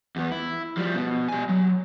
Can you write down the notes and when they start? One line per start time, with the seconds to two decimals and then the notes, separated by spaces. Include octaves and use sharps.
0.16 E2 B3
0.32 E4
0.77 F3 G3
0.95 B2
1.28 G3 G#5
1.49 F#3